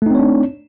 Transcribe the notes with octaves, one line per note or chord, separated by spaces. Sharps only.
A3 C4 D4 D#4 C#5